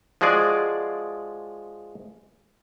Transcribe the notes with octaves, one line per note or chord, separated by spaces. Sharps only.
F3 G#3 F#4 G#4 D5